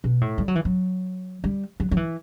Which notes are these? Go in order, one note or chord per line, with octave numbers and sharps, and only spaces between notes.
B2
A2
G3
F#3
E3
F#3
G3
F#3
F#3
E3